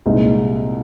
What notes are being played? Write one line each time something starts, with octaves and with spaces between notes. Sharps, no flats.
C2 A#2 G#3 D#4